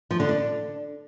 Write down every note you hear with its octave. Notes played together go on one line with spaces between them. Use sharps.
F3
D3
D4